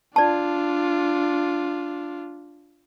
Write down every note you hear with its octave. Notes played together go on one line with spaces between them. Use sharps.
D4 F4 D5 A5